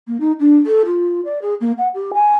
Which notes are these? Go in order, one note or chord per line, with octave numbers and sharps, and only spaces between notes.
A#3
D#4
D4
A4
F4
D5
G#4
A#3
F#5
G4
G#5